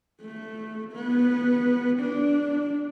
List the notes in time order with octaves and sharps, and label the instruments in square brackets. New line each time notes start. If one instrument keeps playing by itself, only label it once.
[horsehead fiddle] A3
B3
D4